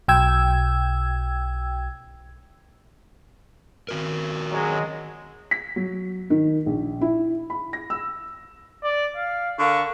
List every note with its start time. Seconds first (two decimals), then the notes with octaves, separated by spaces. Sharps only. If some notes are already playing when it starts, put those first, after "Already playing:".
0.08 B1 G5 E6 G#6
3.89 D#3 F#4 A#4
4.52 F#3 G#3
5.51 B6
5.76 F#3
6.30 D#3
6.66 A#1
7.01 E4
7.50 B5
7.73 A#6
7.90 E6
8.83 D5
9.17 F5
9.59 D3 A#4 F5 C#6